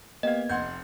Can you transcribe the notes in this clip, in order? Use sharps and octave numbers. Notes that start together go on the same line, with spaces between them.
A#3 B3 G4 D#5 F5 G#6
F1 F#5 C6 G6